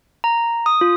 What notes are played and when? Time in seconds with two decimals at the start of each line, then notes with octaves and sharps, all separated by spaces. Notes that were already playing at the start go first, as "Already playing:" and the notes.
0.24 A#5
0.66 D#6
0.81 F4